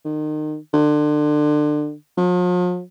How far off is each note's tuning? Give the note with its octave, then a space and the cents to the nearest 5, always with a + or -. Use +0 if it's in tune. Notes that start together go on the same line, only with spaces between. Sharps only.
D#3 -30
D3 +30
F3 +45